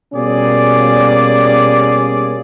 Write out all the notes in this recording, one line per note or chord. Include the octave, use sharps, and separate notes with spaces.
B2 G3 A#3 C#4 G#4 D5